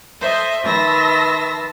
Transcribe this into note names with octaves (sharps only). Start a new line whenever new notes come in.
A4 C5 D#5 E5
D#3 B4 E5 A5 C6 A#6